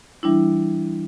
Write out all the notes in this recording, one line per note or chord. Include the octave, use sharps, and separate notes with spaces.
E3 G3 D4 E4